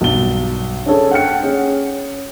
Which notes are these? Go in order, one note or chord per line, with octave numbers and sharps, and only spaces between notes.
B1 G2 G7
C#4 D4 G#4 A4 C#5
F#5 G5 F6 C#7
C#4 G#4